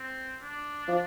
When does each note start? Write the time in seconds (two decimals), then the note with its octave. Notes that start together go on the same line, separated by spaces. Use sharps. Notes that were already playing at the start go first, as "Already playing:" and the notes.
Already playing: C4
0.42 D4
0.88 F3